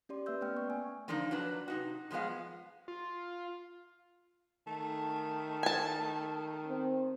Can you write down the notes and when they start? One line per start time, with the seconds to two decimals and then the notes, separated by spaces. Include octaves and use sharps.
0.09 C#4 G4 D5 C6
0.26 A#3 B4 E5 E6 G6
0.41 A3 B3 C#4 D5 G5 F6
0.57 C#6
0.70 G#5
1.08 D3 F3 A#3 D4 D#4
1.31 F#3 D4 B4 A5
1.68 C3 D#4 F#4
2.11 C3 F3 G#3 B3 F5
2.88 F4
4.67 D#3 A3
5.63 G#5 A5
6.68 C4